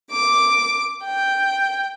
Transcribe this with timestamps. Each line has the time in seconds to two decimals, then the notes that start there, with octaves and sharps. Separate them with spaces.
0.10 D6
1.03 G5